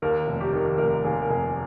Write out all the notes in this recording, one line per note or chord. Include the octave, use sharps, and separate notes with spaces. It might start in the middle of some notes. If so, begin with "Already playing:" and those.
D#2 A#4
F1
G4
D#3
F1 A#4
D#2 G#4
A#4
F1 G#4